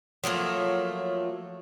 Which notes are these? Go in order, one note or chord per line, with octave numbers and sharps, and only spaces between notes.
F3 F#3 A3 A#3